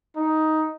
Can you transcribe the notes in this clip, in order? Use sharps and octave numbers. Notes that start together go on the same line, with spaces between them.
D#4